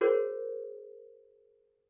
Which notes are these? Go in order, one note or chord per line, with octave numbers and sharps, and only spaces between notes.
F#4 G#4 A#4 C5 C#5